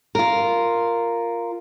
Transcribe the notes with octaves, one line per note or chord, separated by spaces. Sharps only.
F4 A#4